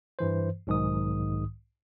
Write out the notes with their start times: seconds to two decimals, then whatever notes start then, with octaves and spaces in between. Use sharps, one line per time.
0.19 G2 E3 C5
0.67 B1 G#2 D#3 D#6